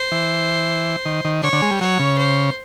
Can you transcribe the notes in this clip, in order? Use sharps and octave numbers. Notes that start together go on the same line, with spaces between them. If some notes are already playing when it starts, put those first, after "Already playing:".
Already playing: C5
E3
D#3
D#3
D3 C#5
D3
G#3
G3
F#3 C#5
C#3
C5